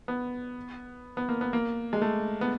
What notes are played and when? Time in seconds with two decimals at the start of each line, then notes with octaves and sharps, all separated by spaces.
0.08 B3
1.17 B3
1.29 A#3
1.41 B3
1.53 A#3
1.93 G#3
2.01 A3
2.41 B3